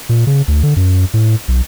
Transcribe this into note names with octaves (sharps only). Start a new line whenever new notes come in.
A#2
C#3
D2
D3
F#2
A2
B1